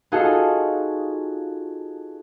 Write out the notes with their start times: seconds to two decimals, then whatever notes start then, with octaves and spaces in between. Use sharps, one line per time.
0.12 D#4 F4 F#4 G#4 A4 D#5